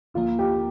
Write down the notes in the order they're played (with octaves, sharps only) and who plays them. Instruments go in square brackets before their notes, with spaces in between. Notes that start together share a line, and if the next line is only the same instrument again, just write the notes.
[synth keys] D2 D3 F3 A#3 [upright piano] F4
[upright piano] G4